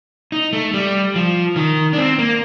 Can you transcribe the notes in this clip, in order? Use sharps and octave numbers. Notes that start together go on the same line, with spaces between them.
D#4
A3
G3
F3
D#3
D4
C4
A#3